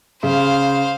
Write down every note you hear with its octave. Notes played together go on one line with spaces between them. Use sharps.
C#3 C5 F5